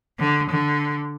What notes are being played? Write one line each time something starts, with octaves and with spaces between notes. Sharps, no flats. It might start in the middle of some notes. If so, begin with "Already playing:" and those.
D3
D3